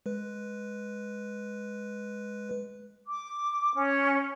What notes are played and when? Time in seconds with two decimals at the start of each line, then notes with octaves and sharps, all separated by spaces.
0.06 G#3 B4
3.08 D6
3.75 C#4